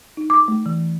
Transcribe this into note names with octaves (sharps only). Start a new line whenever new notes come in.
D#4
D6
A3
E3